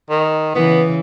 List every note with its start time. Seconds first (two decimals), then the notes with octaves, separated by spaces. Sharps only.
0.10 D#3
0.55 C#3 E3 B3